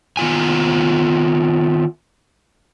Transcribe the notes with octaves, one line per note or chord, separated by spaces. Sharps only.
D#3 B3 F4 G#5